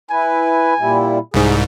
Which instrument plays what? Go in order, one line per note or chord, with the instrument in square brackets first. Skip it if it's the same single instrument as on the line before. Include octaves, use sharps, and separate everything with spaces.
[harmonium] E4 B4 [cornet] G#5
[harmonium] A#2 G3 E4
[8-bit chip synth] C2 G#2 [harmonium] G#4